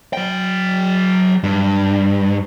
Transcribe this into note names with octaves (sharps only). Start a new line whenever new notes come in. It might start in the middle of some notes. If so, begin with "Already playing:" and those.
F#3 G5
G2